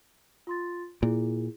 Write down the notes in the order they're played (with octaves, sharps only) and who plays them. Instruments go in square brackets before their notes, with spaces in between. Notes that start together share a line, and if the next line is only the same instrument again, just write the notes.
[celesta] F4 C6 A6
[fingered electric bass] A#2 [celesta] E4 G#4